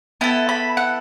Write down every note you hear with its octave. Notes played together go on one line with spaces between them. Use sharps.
B3 E4 A4
B5
F#5